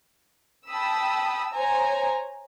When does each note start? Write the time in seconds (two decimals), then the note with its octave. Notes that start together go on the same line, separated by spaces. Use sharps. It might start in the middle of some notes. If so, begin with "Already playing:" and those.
0.69 G5 A5 B5 D#6 E6
1.53 C5 C#5 G#5 A#5